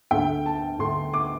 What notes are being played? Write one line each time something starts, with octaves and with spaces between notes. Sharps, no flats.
D2 D3 A3 G5
A5
D2 D3 A3 C6
D6